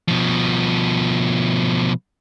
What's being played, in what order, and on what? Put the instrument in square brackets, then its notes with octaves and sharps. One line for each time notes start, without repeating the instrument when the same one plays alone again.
[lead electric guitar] B2 F3